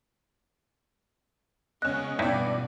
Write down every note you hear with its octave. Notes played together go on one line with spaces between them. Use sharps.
C#3 G#3 B3 C#4 D#5 F#6
E2 G2 B2 D#4 E4 D5 E5